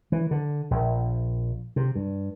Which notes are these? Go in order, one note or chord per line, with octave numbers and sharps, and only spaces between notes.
E3
D3
A#1
C3
G2